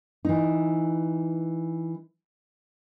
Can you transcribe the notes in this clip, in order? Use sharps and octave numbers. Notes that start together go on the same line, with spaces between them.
E3 D#4